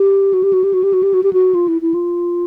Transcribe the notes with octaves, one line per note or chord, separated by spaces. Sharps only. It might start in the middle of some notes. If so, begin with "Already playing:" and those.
Already playing: G4
F#4
G4
F#4
G4
F#4
G4
F#4
G4
F#4
G4
F#4
F4
E4
E4
F4